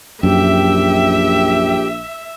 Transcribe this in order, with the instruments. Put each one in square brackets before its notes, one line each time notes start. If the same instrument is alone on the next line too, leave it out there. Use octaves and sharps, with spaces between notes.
[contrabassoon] A#1 [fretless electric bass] F#2 [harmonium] G4 G5 [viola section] E5